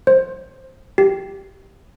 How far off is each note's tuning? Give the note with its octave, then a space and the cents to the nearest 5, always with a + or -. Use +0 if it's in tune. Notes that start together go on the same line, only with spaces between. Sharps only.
C5 +15
G4 -5